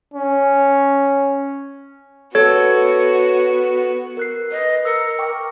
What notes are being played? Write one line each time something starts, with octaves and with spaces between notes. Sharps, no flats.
C#4
B3 F#4 A4 C#5
A#4 F#6 C7
B4 D#5
A#4 E6 C#7
G5 C#6 D6